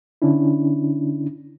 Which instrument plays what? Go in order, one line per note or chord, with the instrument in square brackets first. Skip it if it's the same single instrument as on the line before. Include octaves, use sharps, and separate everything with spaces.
[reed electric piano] D3 C#4 D4 E4